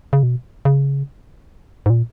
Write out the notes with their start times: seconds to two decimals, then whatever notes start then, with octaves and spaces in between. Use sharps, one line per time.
0.13 C#3
0.23 B2
0.65 C#3
1.86 G#2
1.90 A#2